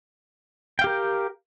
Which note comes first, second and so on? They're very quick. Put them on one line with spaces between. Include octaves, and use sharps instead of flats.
G5 F5 G4 A#4